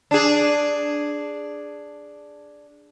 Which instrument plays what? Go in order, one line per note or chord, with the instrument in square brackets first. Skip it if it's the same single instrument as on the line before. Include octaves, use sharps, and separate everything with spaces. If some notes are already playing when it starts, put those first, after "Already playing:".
[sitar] D4 G#4